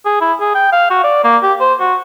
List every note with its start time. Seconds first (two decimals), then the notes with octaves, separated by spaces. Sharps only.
0.05 G#4
0.21 E4
0.40 G#4
0.55 G5
0.72 F5
0.91 F#4
1.04 D5
1.24 A#3
1.43 G4
1.60 C5
1.80 F#4